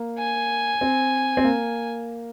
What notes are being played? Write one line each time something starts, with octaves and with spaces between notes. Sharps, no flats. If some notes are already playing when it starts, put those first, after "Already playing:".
Already playing: A#3
G#5
C4
C4
A#3